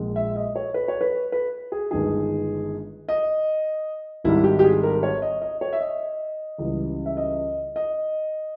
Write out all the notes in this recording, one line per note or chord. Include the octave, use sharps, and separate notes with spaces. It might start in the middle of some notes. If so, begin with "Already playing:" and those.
Already playing: A#1 A#2 G#3
E5
D#5
C#5
B4
C#5
B4
B4
G#4
G1 G2 D#3 G#3 G#4
D#5
G#1 G#2 G3 E4
G4
G4
G#4
A#4
C#5
D#5
D#5
C#5
E5
D#5
C#2 C#3 E3 G3
E5
D#5
D#5